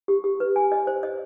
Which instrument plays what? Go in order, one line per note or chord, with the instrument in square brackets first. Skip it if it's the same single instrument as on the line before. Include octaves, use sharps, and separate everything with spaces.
[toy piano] G4
G4
B4
G#5
D#5
C5
D#5